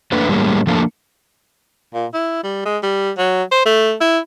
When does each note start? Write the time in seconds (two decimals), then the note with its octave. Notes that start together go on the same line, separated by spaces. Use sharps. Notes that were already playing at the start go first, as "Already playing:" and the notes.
0.12 A3 A#3 D4 B4
0.29 A2 G3 G#3 A#3 C#4
0.67 F3 A3 A#3 C#4 D4 A4
1.94 A#2
2.13 E4
2.43 G3
2.65 G#3
2.83 G3
3.18 F#3
3.51 C5
3.66 A3
4.01 E4